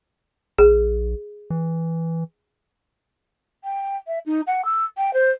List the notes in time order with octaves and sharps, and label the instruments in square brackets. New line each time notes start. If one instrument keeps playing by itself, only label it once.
[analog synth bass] A#1 [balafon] G#4
[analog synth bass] E3
[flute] G5
E5
D#4
F#5
E6
G5
C5